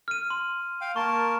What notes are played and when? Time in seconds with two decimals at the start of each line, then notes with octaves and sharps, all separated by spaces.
0.08 F6 D#7
0.30 C6
0.81 F5 G5
0.96 A#3 A#4 A5 C#6